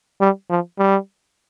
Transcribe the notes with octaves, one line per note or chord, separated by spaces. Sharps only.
G3
F3
G3